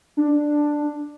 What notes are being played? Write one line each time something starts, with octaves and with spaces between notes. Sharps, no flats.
D4